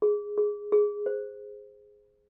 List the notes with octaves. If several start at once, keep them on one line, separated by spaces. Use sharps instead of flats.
G#4
G#4
G#4
C5